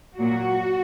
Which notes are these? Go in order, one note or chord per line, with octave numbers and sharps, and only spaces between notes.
A#2 F#3 A#3 F#4